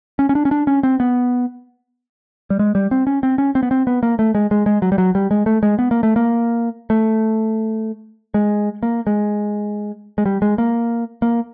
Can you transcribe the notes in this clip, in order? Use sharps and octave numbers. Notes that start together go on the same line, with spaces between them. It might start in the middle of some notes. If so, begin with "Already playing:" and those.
C#4
C#4
D4
C#4
D4
C#4
C4
B3
G3
G#3
G3
C4
C#4
C4
C#4
C4
B3
C4
B3
A#3
A3
G#3
G#3
G#3
F#3
G3
F#3
G3
G#3
A3
G#3
B3
A#3
A3
A#3
A3
G#3
A#3
G#3
G#3
G3
G#3
A#3
A#3